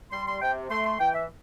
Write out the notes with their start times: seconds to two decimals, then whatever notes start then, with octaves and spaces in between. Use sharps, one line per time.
0.11 G3 C6
0.27 C6
0.41 C3 G5
0.70 A3 C6
0.84 C6
0.99 E3 G5
1.13 E5